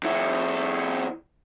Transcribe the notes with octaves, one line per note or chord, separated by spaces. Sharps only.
F2 E4